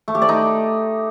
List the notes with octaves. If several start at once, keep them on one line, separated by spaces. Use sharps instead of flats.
A3
G4
D5
D#4